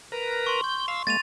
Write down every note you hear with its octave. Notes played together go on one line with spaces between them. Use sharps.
A#4 B4 A#5
C6 C#6
G6
F5 E6
G#3 A#3 A6 D#7 F7